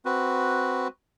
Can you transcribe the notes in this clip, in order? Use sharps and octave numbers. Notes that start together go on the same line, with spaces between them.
C4 F#4 B4